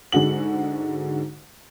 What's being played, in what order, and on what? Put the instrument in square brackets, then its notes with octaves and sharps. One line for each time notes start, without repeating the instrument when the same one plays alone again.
[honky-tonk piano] G#2 D3 G#3 F#4 F#7